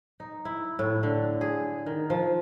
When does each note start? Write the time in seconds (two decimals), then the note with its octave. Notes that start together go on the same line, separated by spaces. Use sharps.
0.20 D#4
0.45 E4
0.79 A2
1.03 D3
1.41 G#4
1.86 D#3
2.10 F3